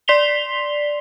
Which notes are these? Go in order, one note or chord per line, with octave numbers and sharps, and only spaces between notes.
D5 C6 B6 C7 F7 G7